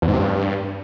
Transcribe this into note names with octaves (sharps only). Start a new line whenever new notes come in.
E2
G#2
C3
G2